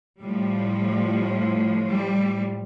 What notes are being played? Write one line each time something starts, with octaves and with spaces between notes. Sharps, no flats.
A2 F3 G3
G3